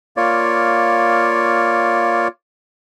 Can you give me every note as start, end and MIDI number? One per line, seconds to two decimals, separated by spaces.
0.17 2.28 58
0.17 2.28 65
0.17 2.28 73
0.17 2.28 74